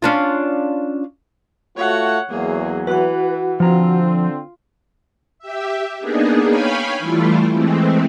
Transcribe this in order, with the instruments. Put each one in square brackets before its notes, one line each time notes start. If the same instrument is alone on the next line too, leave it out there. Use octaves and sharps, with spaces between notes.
[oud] C#4 D4 F4
[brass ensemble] A3 F4 F#4 [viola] C#5 F#5
[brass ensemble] E2 F#3 [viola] A#3 G#4
[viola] E3 [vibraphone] F#4 F#5 [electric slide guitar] B4
[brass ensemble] D3 C4 [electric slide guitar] F3 A#5 [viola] F4
[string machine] G4 E5
A#3 B3 D4 D#4 G#4
C#5 F5 G5 G#5 B5
E3 G3 A3 E4 F4
E3 G#3 A3 C4